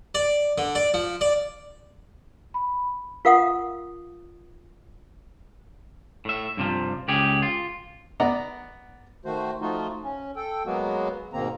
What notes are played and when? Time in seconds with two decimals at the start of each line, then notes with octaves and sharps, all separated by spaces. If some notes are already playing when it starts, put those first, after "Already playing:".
0.15 D5
0.58 D3
0.75 D5
0.94 F3
1.21 D5
2.54 B5
3.25 F4 A#4 F5 F#5 D#6
6.25 A2 E5
6.57 G2 C3 F3
7.08 C#2 G4 G#4
7.42 F4
8.20 B3 D5 F#5 A#5
9.25 D#3 A3 F#4 C5
9.62 F3 A3 D#4 F4 F#4
10.04 C#4
10.36 A4 G5
10.66 F#3 G#3 A#3 B3 F#4
11.33 G#2 B2 D#3 A#3 C4 A#5